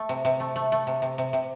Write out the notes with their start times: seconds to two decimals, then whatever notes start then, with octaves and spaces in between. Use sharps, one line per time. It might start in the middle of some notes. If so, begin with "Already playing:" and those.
Already playing: A3
0.09 C3
0.25 C3
0.40 A3
0.56 A3
0.72 A3
0.87 C3
1.02 C3
1.18 C3
1.33 C3